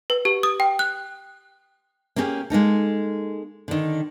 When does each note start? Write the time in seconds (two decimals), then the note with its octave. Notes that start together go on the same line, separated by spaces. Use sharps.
0.10 B4
0.25 G4
0.43 D#6
0.60 G5
0.79 F#6
2.16 A#3 C#4 E4 G4 G#4
2.50 G#3 A#3 D#4 A4
3.68 D3 D#3